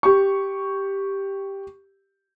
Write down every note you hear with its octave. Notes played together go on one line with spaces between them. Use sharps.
G4 C#6